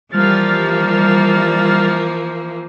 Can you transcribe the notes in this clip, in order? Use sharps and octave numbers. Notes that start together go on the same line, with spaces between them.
E3 F3 G3 A#3 F6 A6